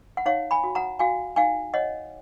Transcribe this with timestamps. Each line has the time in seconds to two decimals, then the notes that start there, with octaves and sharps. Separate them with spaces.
0.17 F#5
0.26 D#4 C#5 F5
0.51 G#5 B5
0.64 F#4
0.75 F#5 A#5
0.99 F#4 F5 G#5
1.36 D#4 F5 G#5
1.74 C#5 D#5 F#5